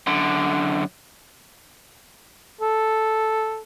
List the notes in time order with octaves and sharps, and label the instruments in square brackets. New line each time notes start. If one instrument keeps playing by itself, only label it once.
[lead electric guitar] F#2 D3
[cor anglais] A4